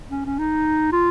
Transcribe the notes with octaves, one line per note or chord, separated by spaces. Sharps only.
C#4
C#4
D#4
F4